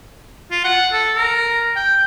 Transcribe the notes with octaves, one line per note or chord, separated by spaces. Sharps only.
F4
F#5
A4
A#4
G5